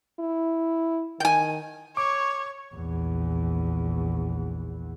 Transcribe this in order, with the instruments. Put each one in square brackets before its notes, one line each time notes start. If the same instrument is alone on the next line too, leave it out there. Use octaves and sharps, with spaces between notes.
[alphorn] E4
[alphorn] D#3 [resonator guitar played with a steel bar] G5 G#5
[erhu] C#5 [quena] C#6 [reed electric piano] D6
[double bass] A#1 E2